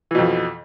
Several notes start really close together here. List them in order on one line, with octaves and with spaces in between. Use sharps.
E3 B2 F2